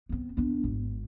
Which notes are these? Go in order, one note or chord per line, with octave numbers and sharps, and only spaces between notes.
B3 C4
B3 D4
G#1